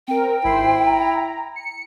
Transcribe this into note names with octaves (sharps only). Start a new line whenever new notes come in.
C4 A#4 G5
G#1 E4 C5 C7
A#5
C#7